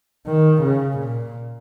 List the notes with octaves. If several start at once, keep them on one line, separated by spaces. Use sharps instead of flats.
D#3
C#3
A#2